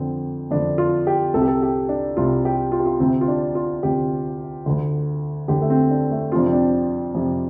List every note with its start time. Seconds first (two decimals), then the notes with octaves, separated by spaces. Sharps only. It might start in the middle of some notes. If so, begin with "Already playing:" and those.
Already playing: F2 D3 C4
0.51 F2 D3 D4
0.78 F4
1.07 G4
1.34 C2 C3 A4
1.42 G4
1.48 A4
1.62 G4
1.89 D4
2.17 C2 C3 F4
2.45 G4
2.72 F4
2.80 G4
2.86 F4
3.00 D2 C3 C4
3.21 F4
3.28 D4
3.55 F4
3.83 D2 C3 G4
4.66 D2 D3
5.48 D2 D3 G4
5.62 A3
5.70 C4
5.91 D4
6.11 A3
6.32 C3 F4
6.35 F2 D4
6.46 C4
6.53 D4
7.15 F2 C3